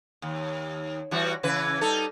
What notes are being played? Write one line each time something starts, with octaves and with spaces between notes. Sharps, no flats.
D#2
E3 G3 F#4
C#3 E3 B4
G3 D#4 A4